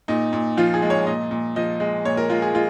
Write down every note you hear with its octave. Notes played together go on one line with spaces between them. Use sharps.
A#2 D#4
A#2
F3 F4
G#4
G#3
C#5
A#2 D#5
A#2
F3 D#5
G#3
A#2 C#5
A#4
G#3 F4
G#4
G#3 F4